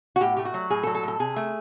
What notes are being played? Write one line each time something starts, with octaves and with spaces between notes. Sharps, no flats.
F#4
A2 G4
A3 G4
F#4
F#3
A2 G#4
A4
F#3
A4
A2
A4
C3 G#4
A3